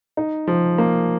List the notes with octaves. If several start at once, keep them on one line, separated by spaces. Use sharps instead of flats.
D#4
F3
A#3